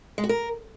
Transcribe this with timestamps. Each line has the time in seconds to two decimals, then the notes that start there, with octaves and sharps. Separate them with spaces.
0.18 G#3
0.24 F#4
0.29 A#4